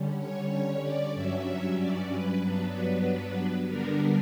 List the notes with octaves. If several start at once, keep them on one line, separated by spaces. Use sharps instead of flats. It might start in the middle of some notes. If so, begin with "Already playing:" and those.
Already playing: D3 G3 C#4
C#5
C#5
D5
G2 F#3 C#4 E5
D5
B4
G2 F#3 B3 D4
D3 G3 B3 D4 A#4